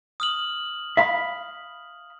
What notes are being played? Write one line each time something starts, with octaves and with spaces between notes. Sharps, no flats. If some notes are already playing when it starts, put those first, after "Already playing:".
D#6 F6 F#7
E5 F5 B5